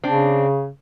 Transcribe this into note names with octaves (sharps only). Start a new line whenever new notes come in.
C#3 C4 D4